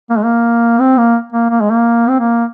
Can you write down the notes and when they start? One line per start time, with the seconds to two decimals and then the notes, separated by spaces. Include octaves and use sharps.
0.10 A#3
0.17 G#3
0.25 A#3
0.79 C4
0.97 A#3
1.32 A#3
1.50 A#3
1.61 G#3
1.70 A#3
2.09 C4
2.20 A#3